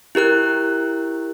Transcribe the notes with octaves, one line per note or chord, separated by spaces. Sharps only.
E4 G4 A#4 F#6